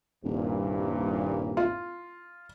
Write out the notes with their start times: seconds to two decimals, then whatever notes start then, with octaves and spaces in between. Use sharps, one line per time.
0.24 D#1 C2 G2 A#2
1.57 F4